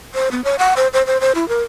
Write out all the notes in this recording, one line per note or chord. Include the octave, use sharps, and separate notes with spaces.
C5
B3
C#5
F#5
C5
C5
C5
C5
E4
A#4